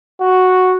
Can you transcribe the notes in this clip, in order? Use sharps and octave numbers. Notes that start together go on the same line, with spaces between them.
F#4